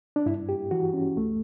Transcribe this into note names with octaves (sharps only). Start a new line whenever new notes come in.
D4
G2 E4
G4
E3 F#4
C#4
C#2 A3